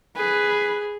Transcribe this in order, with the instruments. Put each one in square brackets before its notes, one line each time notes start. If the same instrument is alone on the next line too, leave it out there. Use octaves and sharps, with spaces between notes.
[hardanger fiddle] G#4 [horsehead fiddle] B4